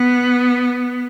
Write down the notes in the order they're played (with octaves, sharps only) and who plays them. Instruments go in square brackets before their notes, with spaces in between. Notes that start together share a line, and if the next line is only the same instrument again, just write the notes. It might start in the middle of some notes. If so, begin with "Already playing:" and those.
Already playing: [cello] B3